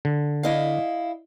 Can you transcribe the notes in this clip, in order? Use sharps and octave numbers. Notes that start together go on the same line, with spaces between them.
D3
E4 D#5 F5